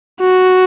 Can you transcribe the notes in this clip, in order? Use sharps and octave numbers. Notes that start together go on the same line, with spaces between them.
F#4